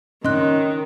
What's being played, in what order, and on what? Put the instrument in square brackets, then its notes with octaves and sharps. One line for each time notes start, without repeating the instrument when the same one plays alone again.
[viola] D#3 [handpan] C#4 [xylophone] D#5 C6 F#6